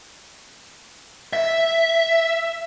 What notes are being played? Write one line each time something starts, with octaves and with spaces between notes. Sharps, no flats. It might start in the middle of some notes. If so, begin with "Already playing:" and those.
E5